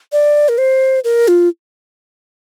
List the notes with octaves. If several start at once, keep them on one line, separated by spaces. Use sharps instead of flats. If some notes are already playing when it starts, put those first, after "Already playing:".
D5
A#4
C5
A#4
F4